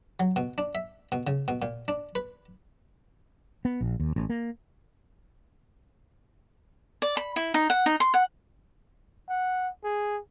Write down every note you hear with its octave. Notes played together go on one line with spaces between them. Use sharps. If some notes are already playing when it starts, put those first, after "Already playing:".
F#3
B2
D4
E5
B2
C#3
B2
A#2
D4
B4
B3
A#1
D#2
A1
A#3
D5
B5
E4
D#4
F#5
D#4
C6
F#5
F#5
G#4